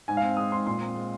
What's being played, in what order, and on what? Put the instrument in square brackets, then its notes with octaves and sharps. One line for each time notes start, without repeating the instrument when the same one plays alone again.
[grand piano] G#2 G#5
F5
C4
G#3 D#6
G#2 C6
A#2 C6
C4
G#3